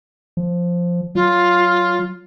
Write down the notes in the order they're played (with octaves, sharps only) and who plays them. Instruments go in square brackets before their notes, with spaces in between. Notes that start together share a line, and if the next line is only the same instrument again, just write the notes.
[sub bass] F3
[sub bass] F#3 [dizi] F4